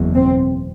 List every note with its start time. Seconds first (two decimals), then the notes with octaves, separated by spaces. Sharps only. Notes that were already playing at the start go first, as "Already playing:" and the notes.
Already playing: F#1 E2 B2
0.15 C4